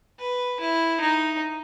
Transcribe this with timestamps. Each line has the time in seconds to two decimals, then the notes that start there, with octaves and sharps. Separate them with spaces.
0.19 B4
0.60 E4
1.01 D#4